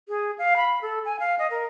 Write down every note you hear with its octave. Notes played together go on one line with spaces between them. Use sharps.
G#4
F5
B5
A4
G#5
F5
D#5
A#4